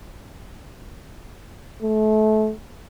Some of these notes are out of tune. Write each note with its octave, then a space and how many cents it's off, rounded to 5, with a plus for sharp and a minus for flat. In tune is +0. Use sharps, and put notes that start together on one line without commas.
A3 -30